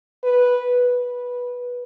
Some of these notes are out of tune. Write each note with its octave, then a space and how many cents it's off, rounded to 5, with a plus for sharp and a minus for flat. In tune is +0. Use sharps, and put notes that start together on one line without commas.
B4 -5
B4 -15